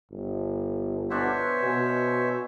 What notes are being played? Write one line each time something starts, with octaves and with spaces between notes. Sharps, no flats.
G1
B2 D4 C5 C#5 E5 G#5
B2 G#5